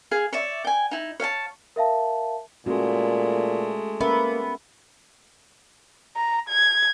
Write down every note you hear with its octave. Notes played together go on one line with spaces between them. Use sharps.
G#4 F5 G#5
C#5 D5 E5
G5 G#5
D#4 E4
C#5 F5 G#5 A5
A#4 E5 F5 A5
A#2 G#3 A3 C#4 F#4
A#3 B3 C#4 A#4 E5
A#5
G#6